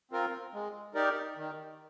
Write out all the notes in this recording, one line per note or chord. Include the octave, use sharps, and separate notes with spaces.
C4 F4 A#4
G#3
D#4 G4 A#4 D5
D#3